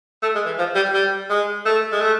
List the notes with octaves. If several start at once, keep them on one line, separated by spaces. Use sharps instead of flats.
A3
G#3
E3
F3
G3
G3
G#3
A3
G#3
A3